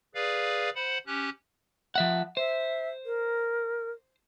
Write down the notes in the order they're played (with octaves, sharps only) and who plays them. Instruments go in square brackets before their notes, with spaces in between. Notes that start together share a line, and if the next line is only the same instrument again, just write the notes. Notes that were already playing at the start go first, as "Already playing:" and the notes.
[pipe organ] G#4 B4 D5 F5
C5 F#5 B5
C#4 G4 F#6
[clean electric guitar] F3 E5 F#5
[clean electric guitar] C5 [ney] E5
[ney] A#4